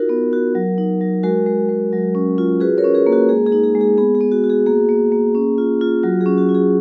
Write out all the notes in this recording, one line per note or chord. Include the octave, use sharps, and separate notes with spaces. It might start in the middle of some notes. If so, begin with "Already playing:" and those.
Already playing: D#4 F4 F#4 A#4
B3
F#4
F#3
D#4
F#3
G#3 F#4 A#4
G#3
G#3
F#3
C#4
F4
F#4 G#4 B4
A#4 C#5
C#4
G#4 B4
A#3
F#4 A#4
G#3 G#4
G#4
D#4
G#4
G#3
G#4
B3 G#4
G#4
B3
F#4
F#4
G#4
A#3 G#4
A#3
A#3
C#4
F4
F4
F#3 F#4
G#4
C#4
F#4
F4
G#4